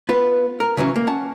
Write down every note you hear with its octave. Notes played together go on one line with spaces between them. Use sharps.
B3 F4 B4
A#4
C#3 E3 F#3 C#4
A#3
C#4 F#5 A5